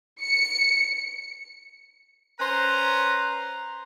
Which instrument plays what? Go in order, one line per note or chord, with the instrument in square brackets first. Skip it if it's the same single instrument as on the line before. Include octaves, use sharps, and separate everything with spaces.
[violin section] C#7
[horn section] C#4 B4 C5 A#5